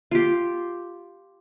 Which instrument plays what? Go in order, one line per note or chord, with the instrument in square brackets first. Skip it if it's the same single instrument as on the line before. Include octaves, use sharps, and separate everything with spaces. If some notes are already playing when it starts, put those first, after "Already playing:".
[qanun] F4 G4